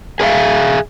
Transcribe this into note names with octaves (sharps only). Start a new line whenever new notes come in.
G#4 B4 D5 E5 F5